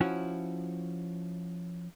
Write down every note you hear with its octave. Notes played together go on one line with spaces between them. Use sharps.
F3 C#4 E4 F#4